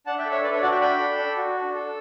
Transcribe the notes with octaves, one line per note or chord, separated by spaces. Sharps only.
D4 F#5 A5
E5 G5
A4
C#5 E5
D4 B4 D5
C#5 E5
F#4 D5 F#5
E5 G5
D4 G5 B5
A4
D4
F#4
D4
A4